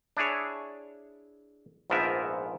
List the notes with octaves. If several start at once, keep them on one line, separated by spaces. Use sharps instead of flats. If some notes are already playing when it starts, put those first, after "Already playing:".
D4 E4 G#4 C#5
A#1 G#2 F3 B3 A#4 E5